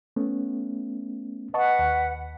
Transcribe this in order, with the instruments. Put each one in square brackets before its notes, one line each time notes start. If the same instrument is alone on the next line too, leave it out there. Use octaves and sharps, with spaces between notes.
[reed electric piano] A3 B3 C#4
[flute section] B4 F#5 [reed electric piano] D#5 A5 C#6
[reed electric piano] D#2